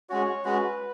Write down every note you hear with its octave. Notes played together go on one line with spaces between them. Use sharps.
G#3 C#4 F#4 C#5
G#3 C#4 F#4 B4